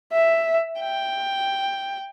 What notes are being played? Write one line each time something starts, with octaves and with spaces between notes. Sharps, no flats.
E5
G5